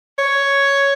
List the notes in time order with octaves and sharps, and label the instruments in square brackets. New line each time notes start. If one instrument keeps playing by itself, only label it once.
[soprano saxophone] C#5